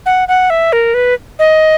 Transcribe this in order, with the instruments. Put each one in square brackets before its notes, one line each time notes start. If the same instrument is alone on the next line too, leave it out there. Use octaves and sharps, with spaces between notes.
[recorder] F#5
F#5
E5
A#4
B4
D#5